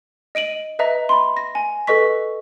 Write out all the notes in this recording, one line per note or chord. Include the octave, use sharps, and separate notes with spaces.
D#5 D7 D#7 F#7
B4 D#5 E5 A#5
B5 C6
A#6
G#5
A4 B4 D#5 C#6 B6